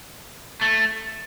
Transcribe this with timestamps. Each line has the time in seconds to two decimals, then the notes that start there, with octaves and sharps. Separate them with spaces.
0.61 A3